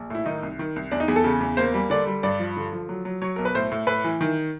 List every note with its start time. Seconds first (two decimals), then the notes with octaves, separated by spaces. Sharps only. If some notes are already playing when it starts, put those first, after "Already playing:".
Already playing: A#1
0.10 A2 E4
0.26 D#3 D#4
0.43 C2
0.59 D#3
0.76 C2
0.91 E2 D4
1.00 D#4
1.08 E2 G#4
1.16 A4
1.24 C#3
1.41 E2
1.57 A#3 C5
1.74 G3
1.90 D3 D5
2.07 G3
2.23 G2 D5
2.39 F3
2.57 D3
2.73 F3
2.89 F#3
3.05 F#3
3.22 F#3 C#5
3.36 B1 A#4
3.45 B4
3.55 A2 C5
3.72 A2
3.87 A2 B4
4.04 E3
4.21 D#3